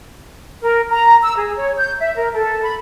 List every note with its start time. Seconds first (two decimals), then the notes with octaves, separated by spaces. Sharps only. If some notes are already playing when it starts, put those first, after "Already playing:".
0.61 A#4
0.90 A#5
1.23 E6
1.36 G#4
1.57 C#5
1.78 G6
1.99 E5
2.15 A#4
2.34 A4
2.63 B5